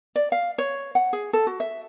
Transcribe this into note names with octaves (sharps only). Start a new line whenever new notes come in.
D5
F5
C#5
F#5
G#4
A4
F#4
E5